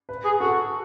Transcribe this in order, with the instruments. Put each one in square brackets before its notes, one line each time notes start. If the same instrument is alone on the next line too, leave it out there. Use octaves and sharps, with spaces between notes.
[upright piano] B4
[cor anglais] G#4
[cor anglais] F#4 [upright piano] A4